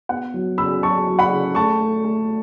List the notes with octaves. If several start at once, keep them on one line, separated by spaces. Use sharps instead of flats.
B3 F#5
F#3
C#3 B5 E6
F#3 A5 C#6
F#3
F#5 B5
C#3
A3 A5 C#6
A3
A3